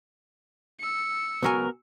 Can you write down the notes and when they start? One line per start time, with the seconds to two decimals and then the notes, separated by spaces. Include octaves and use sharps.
0.80 E6 C#7
1.43 C#2 F#3 B3 A#4 G#5